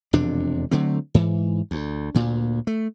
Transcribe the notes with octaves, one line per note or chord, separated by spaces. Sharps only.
E1 F2 C3 D4
D3 F#3 A3 C4
G#2 E3
D2
D2 A#2
A3